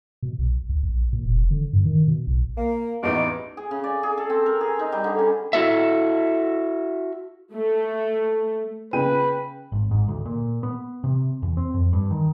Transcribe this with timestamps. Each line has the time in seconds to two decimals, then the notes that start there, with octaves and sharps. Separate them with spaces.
0.23 B2
0.39 B1
0.69 D2
0.83 A#1
1.13 A#2
1.26 F1
1.51 D3
1.73 G2
1.85 D#3
2.07 B2
2.27 B1
2.57 A#3
3.03 A1 E2 B2 D#4 D6
3.57 G#4
3.71 C#3
3.84 D5
4.03 G#4
4.17 A4
4.30 C4
4.46 A#4
4.61 G#4
4.79 D#4
4.92 G3
5.04 D3
5.19 C#4
5.53 E4 F#4 A4 E5
7.54 A3
8.93 C#3 B4 G5 D#7
9.72 G#1
9.91 G#2
10.08 D2
10.26 A#2
10.63 B3
11.04 C3
11.42 E2
11.57 C4
11.74 F2
11.93 G2
12.11 D#3